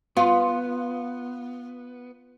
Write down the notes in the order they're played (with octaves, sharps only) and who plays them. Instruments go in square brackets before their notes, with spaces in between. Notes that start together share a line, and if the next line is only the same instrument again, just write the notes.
[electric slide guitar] B3 [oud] F4